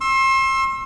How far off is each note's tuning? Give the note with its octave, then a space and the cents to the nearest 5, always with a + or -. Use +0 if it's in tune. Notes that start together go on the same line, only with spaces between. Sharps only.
C6 +35 E6 +0